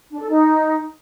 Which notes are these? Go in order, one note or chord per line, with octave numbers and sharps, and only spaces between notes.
D4
A4
D#4